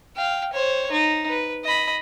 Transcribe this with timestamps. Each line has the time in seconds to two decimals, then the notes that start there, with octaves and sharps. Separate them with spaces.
0.16 F5 G5
0.53 C5 C#5
0.91 D#4
1.29 B4
1.64 D#5 B5